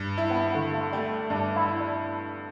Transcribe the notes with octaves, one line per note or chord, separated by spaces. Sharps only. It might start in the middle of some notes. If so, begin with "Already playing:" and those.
Already playing: G2
E4
B3
D3 A3
A3
G3 A3
G2 D4
E4
E4
D4